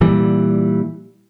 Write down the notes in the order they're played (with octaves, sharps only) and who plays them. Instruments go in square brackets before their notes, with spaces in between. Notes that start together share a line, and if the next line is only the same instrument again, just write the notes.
[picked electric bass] A#2 E3 G3